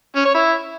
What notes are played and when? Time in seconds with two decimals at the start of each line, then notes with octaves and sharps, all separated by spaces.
0.16 C#4
0.25 C#5
0.34 E4